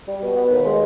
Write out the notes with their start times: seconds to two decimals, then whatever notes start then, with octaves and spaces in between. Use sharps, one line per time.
0.08 G3
0.22 B2
0.36 B3
0.50 D#2
0.65 G#3